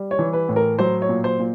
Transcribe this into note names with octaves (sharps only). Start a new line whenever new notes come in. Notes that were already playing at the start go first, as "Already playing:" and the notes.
Already playing: G3
C#5
E3
B4
A2
A#4
F#3 C5
C#5
A#2
C5
A#2